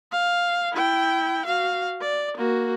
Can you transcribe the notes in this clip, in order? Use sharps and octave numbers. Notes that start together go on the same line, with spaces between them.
F5
E4 G5
F#4 F5
D5
A#3 F#4